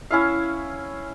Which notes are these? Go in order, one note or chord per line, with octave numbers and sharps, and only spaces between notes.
C#4 E4 F5